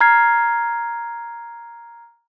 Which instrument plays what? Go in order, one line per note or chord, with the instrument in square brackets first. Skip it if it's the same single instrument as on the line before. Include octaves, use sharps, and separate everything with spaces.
[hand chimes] A#5 F6 G#6 C7